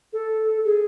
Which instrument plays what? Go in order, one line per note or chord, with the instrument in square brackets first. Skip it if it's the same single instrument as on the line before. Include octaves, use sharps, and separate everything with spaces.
[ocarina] A4
G#4